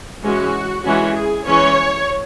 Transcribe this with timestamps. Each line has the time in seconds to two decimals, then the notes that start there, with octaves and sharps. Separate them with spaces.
0.23 E3 G#3 C#4 F#4
0.84 E3 G#3 C#4 F#4
1.15 G#4
1.46 E3 G#3 C#4 C#5